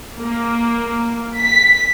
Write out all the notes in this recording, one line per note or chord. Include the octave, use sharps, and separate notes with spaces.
A#3
B6